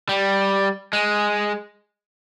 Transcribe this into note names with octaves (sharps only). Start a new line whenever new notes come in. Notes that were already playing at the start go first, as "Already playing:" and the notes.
G3
G#3